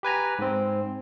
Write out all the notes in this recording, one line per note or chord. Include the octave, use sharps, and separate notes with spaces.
G4 B4 G#5 A#5
G#2 C4